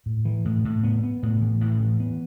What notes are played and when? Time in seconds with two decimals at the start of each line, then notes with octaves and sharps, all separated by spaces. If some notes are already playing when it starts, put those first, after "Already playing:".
0.06 A2
0.25 E3
0.45 A2
0.65 A2
0.84 B3
1.04 B3
1.23 A2
1.42 E3
1.61 A2
1.80 E3
2.00 B3